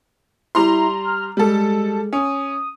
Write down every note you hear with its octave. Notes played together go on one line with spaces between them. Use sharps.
G3 E4 A#5 C6
F6
G3 G#3 A4
C#4 D#6